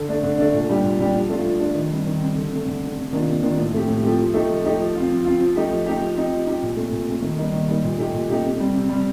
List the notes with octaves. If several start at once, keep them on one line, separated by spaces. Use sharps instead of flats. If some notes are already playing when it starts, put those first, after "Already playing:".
Already playing: D3
A3 D4
D3
A3 D4
A#2
G3 D4 G4
A#2
G3 D4 G4
F3
A3 D4 F4
F3
A3 D4 F4
D#3
G3 C4
D#3
G3 C4
D3
A3 C4
D3
A3 C4
C3
D#3 A#3 D4 F4
C3
D#3 A#3 D4 F4
A2
F3 A3 C4 G4
A2
F3 A3 C4 G4
F3
A3 D#4 G4
F3
A3 D#4 G4
F3
C4 F4
F3
C4 F4
F3
A3 D#4 G4
F3
A3 D#4 G4
F3
C4 D#4 G4
F3
C4 D#4 G4
A#2
A3 C4
A#2
A3 C4
D#3
G3 A#3 D#4
D#3
G3 A#3 D#4
A#2
A3 D#4 G4
A#2
A3 D#4 G4
C3
G3 C4
C3
G3 C4